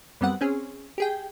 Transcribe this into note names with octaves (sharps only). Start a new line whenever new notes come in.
F#2 G3 B3 C4 F#5
C4 C#4 G#4
G4 G#4 G5